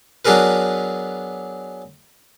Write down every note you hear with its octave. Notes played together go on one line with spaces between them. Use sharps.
F#3 B3 D4 G#4 A#4 B4